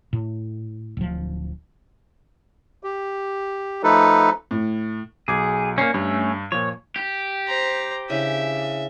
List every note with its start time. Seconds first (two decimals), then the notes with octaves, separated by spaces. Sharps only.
0.13 A2
0.97 D1 F3
2.83 G4
3.83 F3 A3 D#4 A4 B4
4.51 A2
5.28 B1 G#4 D6 G#6
5.78 A#3 C#4 D5 C7
5.94 G2 A3 C#4
6.52 A#2 F3 C#5
6.96 G4
7.47 C5 A#5
8.10 C#3 E3 D4 E5